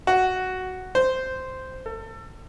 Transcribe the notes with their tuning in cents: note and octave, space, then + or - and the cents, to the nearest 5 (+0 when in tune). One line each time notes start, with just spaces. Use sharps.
F#4 +5
C5 -5
A4 +30